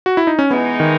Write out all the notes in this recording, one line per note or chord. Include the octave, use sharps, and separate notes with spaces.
F#4
E4
D#4
C#4
E3 G#3 B3 D#4
D#3